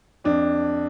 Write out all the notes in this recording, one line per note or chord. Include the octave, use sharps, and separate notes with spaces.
F2 D4